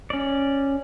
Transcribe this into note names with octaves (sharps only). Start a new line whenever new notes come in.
C#4 D5